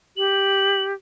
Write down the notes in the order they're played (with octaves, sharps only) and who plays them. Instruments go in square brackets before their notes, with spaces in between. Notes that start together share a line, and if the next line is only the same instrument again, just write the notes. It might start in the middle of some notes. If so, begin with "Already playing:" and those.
[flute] G4 [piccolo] F#7